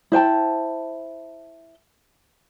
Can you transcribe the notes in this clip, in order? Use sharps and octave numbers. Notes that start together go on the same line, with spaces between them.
E4 C5 G5 A5